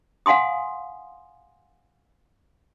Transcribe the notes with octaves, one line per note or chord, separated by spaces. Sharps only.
F5 F#5 G#5 C6 D#6